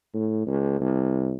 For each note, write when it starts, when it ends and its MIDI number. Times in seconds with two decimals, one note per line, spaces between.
0.14 0.44 45
0.47 0.80 37
0.80 1.36 36